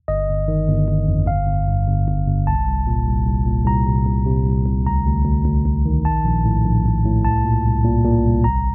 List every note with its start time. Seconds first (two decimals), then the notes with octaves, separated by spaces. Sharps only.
0.08 G1 D#5
0.28 G1
0.48 D#3
0.68 G1
0.88 G1
1.07 F2
1.27 G1 F5
1.48 G1
1.68 G2
1.87 G1
2.08 G1
2.27 G1
2.47 C2 A5
2.68 C2
2.87 A#2
3.07 C2
3.26 C2
3.46 A#2
3.66 C2 A#5
3.86 C3
4.07 C2
4.26 C3
4.46 C2
4.66 C2
4.86 D2 A#5
5.06 D2
5.25 D2
5.46 D2
5.65 D2
5.86 D#3
6.05 A#1 A5
6.25 A#1
6.45 A2
6.65 A#1
6.85 A#1
7.05 A2
7.25 C2 A5
7.45 A#2
7.65 C2
7.84 A#2
8.05 A#2
8.24 C2
8.44 A1 A#5